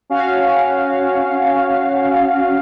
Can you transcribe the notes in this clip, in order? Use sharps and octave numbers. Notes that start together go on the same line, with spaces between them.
C#4 F#4 F5